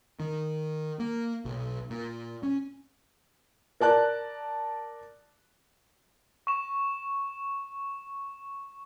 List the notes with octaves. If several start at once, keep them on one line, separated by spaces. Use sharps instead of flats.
D#3
A#3
B1
A#2
C#4
A#4 D5 A5 F#6
C#6 E7